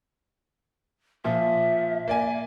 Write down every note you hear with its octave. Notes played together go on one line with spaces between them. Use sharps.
A#2 F3 E5
A#3 D5 G#5